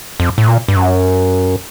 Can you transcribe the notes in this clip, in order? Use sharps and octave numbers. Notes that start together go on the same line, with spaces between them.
F2
A2
A#2
G2
F#2